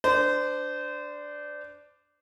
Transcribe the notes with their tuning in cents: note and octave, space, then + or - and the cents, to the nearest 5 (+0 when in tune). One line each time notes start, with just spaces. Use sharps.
D4 +0 C5 -25